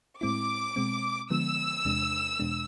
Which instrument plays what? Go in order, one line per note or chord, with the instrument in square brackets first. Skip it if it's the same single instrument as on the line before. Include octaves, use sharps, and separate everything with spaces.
[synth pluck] A2 G#3 C4 E4 [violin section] D6
[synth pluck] B2 G#3 C4
[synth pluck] D3 F3 G#3 B3 [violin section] E6
[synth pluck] E2 C3 G#3 D4
E2 B2 G#3 D4